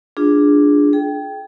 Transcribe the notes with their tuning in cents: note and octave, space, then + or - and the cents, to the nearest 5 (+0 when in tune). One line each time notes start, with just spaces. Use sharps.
D4 +0 F4 +0 G#4 -5
G#4 +35 G5 +0